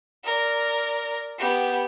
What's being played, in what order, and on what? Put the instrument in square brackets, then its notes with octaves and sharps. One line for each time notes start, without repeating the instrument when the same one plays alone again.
[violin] A#4 D5
B3 G4